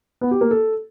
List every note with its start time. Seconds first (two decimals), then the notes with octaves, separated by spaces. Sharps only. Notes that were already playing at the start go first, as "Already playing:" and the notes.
0.21 B3
0.31 G4
0.41 A#3
0.51 A4